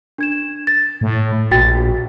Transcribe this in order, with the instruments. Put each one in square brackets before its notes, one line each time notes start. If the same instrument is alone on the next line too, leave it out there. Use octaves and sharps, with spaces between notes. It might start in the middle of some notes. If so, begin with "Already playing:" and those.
[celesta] D4 G#6 E7
A6
[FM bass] A2
[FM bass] A#1 [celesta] F#4 G5 A6